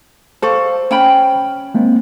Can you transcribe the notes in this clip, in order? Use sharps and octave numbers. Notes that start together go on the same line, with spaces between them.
A4 C5 D5 F5 C#6
C#4 G5 B5
G#3 A#3 C4